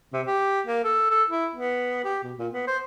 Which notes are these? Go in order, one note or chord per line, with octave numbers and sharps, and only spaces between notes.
C3
G4
A#3
A4
A4
E4
B3
G4
B2
A#2
B3
C5